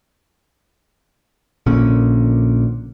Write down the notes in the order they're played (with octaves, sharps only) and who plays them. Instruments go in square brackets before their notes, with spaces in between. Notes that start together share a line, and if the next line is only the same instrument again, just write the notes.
[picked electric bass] A#1 A#2 D3 C#4